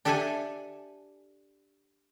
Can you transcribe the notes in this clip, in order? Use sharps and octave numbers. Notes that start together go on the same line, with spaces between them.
D4 G4 A4 E5 F#5 G#5